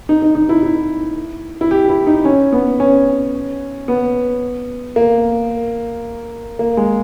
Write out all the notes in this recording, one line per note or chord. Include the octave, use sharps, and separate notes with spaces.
D#4
D#4
D#4
E4
E4
E4
G4
E4
D#4
C#4
B3
C#4
B3
A#3
A#3
G#3